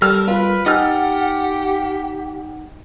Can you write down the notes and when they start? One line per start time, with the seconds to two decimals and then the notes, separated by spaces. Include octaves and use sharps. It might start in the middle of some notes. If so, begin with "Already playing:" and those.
0.02 G3 A4 A#4 F6
0.28 F4 B4
0.66 D#4 G4 F#5 G#5 F6 A6